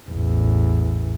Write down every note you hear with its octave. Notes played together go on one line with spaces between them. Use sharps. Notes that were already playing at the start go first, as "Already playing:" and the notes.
A1 E2